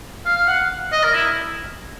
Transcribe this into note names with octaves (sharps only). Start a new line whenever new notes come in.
F5
F5
F#5
D#5
A#4
E4